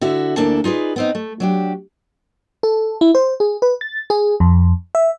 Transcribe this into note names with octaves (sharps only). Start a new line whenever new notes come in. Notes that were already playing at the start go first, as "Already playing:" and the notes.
D3 E4 F#4 E5
D2 A#3 D4 E4 A4 A5
D#4 F4 G#4 B4 D5
B3 C4 D#4
A3
F#3 D4 G4
A4
E4
C5
G#4
B4
A6
G#4
F2
E5